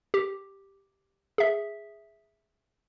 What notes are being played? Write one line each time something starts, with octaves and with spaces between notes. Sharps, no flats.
G4
G#4 E5